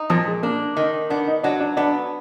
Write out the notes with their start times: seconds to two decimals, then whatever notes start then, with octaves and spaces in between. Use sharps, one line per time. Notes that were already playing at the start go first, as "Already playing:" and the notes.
Already playing: D#4
0.10 A#2 F3
0.27 G#3
0.43 A#3 D4
0.76 D#3 D#4
1.10 B3 D4
1.27 D#4
1.43 F#3 D4
1.60 D4
1.77 B3 D4